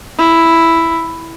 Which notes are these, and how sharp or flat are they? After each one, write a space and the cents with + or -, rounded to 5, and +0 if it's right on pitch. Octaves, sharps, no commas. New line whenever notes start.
E4 +0